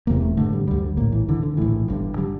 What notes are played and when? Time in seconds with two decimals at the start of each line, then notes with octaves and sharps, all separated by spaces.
0.07 E1 E2 C3 A#3
0.22 A3
0.37 A1 G2 D3 A3
0.53 G3
0.67 D2 D3 G3
0.97 A#1 A2 A#3
1.12 E3
1.28 D2 D3 E3
1.43 D3
1.57 A#1 A2 E3
1.88 G1 G2 D3
2.18 D3 G3